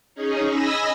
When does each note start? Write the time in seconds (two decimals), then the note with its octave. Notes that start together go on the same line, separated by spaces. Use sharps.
0.15 C#4 D#4 G#4
0.48 D#5 G#5 B5 E6 A#6